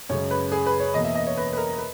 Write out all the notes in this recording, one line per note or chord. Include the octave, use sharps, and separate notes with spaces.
F#2 C#3 G#3 C#5
B4
G#4
B4
C#5
E2 B2 A#3 D#5
E5
D#5
C#5
B4
B4
A#4
B4